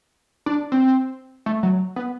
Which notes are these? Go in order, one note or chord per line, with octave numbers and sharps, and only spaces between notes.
D4
C4
A3
F#3
B3